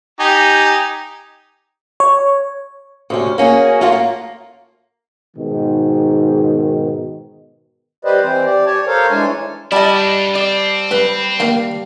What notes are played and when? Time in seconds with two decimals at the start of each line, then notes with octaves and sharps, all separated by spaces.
0.20 D#4 G4 G#5
2.00 C#5
3.10 D2 C3 C#4
3.38 A#3 C#4 F#4 G#4
3.81 A3 A#3 F4 F#4 C#5
3.92 A#3
5.37 G#2 B2 D#3
8.05 G3 G4 B4 C5 D5 D#5
8.23 E3 C4 C5
8.45 G4 D5
8.67 G4 C#5 G#5 A5
8.87 A4 A#4 C5 C#5 F5
9.10 E3 G#3 D4 C#5 G#5 A5
9.72 G3 E4 D5 D#5 A5
9.97 D4 G4
10.35 C4 D5
10.91 G2 B4
11.40 D3 D#3 A#3 F5